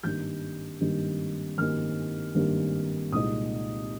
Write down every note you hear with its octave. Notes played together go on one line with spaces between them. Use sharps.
G#1 G2 G3 A#3 D#4 G6
G#1 G2 G3 A#3 D#4
G#1 G2 G3 A#3 D#4 F6
G#1 G2 G3 A#3 D#4
C2 A#2 G#3 D#4 D#6